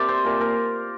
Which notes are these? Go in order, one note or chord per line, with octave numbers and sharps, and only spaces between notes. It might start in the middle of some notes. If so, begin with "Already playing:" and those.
Already playing: C3 G4 A#4 D5
C4 C5
A#2 A#4
A#4